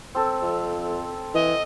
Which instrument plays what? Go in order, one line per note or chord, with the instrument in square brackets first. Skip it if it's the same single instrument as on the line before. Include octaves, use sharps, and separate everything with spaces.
[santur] C4 A4
[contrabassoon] F2
[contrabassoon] E3 [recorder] D#5